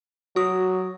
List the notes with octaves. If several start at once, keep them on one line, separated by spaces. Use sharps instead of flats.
F#3 F#4 D#6